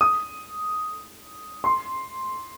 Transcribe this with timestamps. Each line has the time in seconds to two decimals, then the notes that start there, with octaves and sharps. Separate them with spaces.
0.01 D#6
1.64 C6